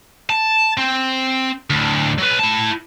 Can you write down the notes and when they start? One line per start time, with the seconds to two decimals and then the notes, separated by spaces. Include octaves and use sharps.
0.30 A5
0.77 C4
1.70 D2 A2
2.18 F#3 B4
2.40 E4 A5